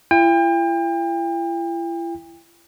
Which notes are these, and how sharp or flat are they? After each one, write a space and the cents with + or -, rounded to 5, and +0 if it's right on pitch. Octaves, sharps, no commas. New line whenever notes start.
E4 +40 G5 +35